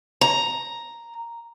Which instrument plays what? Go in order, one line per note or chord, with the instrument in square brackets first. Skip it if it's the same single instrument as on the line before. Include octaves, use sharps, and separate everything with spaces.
[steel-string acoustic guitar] A#5